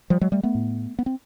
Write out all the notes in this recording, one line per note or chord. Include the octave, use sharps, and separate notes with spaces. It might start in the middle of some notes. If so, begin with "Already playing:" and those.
F3 G3
F#3 G#3
G3 A3
A3 B3
A2
B3
C4